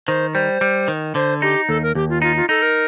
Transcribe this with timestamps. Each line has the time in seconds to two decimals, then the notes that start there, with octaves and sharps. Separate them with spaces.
0.08 D#3 C5
0.34 G3 C5
0.61 G3
0.88 D#3
1.15 D3 C5
1.42 D#4 G4
1.68 D#2 A4
1.83 A#4
1.95 D#2 G4
2.09 F4
2.22 D#4 F4
2.36 F4
2.49 D#4 A4
2.62 A#4